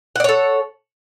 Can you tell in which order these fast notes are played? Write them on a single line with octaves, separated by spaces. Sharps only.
F#5 D5 C#5 A4